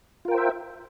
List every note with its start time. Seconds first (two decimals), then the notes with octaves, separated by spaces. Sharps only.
0.25 F4
0.28 A#4
0.31 G5
0.34 C5
0.38 E5